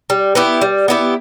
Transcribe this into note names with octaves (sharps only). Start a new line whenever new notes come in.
G3
B3 E4 G4
G3
B3 E4 G4